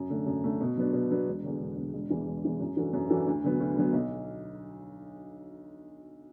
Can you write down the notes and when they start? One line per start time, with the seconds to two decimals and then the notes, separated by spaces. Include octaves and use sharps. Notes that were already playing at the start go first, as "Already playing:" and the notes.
Already playing: F#2
0.10 D3 A3
0.26 F#2
0.44 D3 A3
0.61 B2
0.77 F#3 B3 D4
0.93 B2
1.11 F#3 B3 D4
1.27 E1
1.43 E2 D3
1.60 E1
1.77 E2 D3
1.94 E1
2.10 E2 E3 D4
2.26 E1
2.44 E2 E3 D4
2.60 F#2
2.77 E3 D4 F#4 A4
2.93 F#2
3.10 E3 D4 F#4 A4
3.26 D2
3.44 D3 F#3 B3
3.60 D2
3.76 D3 F#3 B3
3.93 B1